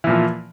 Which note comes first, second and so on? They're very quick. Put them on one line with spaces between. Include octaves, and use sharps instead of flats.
E3 A#2 F3